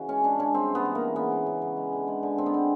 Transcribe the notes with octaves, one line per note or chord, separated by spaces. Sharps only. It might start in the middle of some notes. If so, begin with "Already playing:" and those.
Already playing: C#3 E3 F#4
G#3 C#4
G#3 D4
C#3 C#4
G3 C4
E3 B3
E3
A#3
C#3
C#3 B3
E3
C#3
C#3
G#3
D3
G#3
D3
D3 C4
B3
G#3 C4